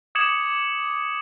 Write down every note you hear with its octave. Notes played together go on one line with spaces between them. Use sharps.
D6 D#6 G#6 C#7 E7 F#7